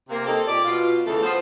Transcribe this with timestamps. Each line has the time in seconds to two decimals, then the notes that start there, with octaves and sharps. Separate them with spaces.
0.09 C3 A#3
0.24 A#3 C4 D#4 G4 A4
0.47 A#2 G4 D5
0.64 B2 F4
1.06 E2 C#3 E3 A3 A4
1.22 F3 B3 F4 C5